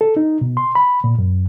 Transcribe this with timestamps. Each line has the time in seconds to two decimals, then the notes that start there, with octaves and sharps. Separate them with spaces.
0.01 A4
0.17 D#4
0.41 B2
0.57 C6
0.75 B5
1.04 A#2
1.19 F#2